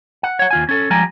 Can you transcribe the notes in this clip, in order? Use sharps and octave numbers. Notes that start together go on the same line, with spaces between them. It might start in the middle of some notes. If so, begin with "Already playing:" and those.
F#5
C#5 F#5
D#2 F4 G#5
C#4 A4
F3 G3 G#3 G5 G#5 A#5